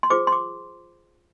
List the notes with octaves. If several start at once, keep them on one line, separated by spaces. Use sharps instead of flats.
C6
F4 G#4 C5 D6
C6
D6